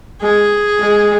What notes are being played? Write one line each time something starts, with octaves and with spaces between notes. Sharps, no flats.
G#3 G#4
G#3